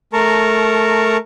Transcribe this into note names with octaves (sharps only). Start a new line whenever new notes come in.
A3 A#4 A5 A#5 C#6